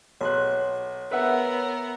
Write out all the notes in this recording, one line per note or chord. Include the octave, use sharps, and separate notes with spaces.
B1 C#5 C6 F#6
B3 A#4 B4 E5 F#5